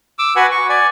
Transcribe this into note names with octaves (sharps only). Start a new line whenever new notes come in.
D6 E6
F#4 B4 F#5 G#5
C#6
D5 G#5